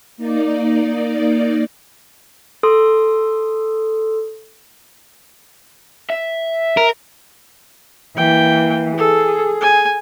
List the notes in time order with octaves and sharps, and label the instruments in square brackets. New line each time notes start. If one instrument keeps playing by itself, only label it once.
[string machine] A#3 D#4 D5
[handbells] A4 C6 D#6
[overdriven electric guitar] E5
[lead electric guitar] A#4
[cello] E3 A#3 [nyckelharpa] G5
[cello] G#4 [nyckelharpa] A4
[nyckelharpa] G#5